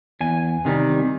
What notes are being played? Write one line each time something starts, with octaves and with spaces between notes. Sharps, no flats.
E2 G#5
C3 D#3 G3